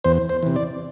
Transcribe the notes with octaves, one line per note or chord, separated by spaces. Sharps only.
E2 C5
C5
C3 E3
D5